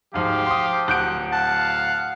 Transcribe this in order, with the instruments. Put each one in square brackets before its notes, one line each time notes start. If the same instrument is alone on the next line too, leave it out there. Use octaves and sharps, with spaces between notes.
[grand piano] D1 G#2 [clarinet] F3 [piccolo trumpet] G4 [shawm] F5
[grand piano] C6 D#6
[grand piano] D1 G6 D7 [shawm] F#5
[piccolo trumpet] F5 [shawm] F#5 [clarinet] A5